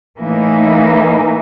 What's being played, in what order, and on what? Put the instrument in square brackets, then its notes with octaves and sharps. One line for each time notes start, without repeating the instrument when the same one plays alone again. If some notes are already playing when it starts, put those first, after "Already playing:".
[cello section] A2 E3 A#3 D#4